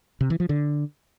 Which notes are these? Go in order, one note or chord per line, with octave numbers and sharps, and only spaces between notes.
C3
E3
F3
D3